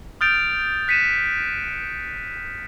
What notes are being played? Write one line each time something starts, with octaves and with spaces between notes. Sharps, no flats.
D#6 F6 G6 A6 D7 F7
F#6 B6 C#7 D#7 E7